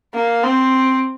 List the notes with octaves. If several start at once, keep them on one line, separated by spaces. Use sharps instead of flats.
A#3
C4